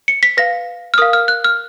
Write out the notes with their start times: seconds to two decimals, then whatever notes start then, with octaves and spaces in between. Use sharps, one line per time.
0.08 C#7
0.23 B6
0.37 B4 F5 A#6
0.94 F6
0.98 A#4 F5 D#6
1.13 F6
1.28 F#6
1.44 F6